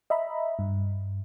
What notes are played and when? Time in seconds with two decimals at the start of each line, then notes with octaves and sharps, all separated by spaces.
0.10 D#5 E5 A#5 B5
0.59 G2